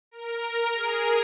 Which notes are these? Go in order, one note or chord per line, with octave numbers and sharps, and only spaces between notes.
A#4
G#4